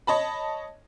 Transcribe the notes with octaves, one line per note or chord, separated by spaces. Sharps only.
C#5 D#5 A5 B5